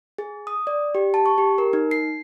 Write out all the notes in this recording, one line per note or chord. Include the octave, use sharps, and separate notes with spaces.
G#4
D#6
D5
G4
A5
C#6
G4
A#4
D#4
C7